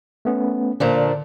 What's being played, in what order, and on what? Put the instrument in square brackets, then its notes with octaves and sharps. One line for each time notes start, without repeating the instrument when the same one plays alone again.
[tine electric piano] A3 B3 C#4
[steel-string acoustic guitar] A#2 F3 D4 [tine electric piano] D3